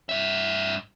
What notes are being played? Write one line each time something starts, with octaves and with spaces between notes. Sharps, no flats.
G2 E5